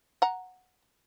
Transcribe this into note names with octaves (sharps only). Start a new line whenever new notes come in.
F#5 A#5